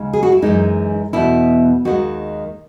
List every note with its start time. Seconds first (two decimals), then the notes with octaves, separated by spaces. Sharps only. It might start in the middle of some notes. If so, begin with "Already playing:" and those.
Already playing: D#2 C#3 G#3
0.13 G#4
0.23 F#4
0.32 E4
0.42 F#2 E3 G#3 D#4
1.13 E2 B2 A3 E4
1.85 D#2 D#3 G#3 F#4